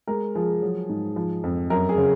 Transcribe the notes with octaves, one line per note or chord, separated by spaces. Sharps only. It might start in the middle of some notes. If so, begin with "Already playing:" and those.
G#3 A#4
F3 G#4
F#3
G#2
F3
F2
F#2 A#4
G#4
C#3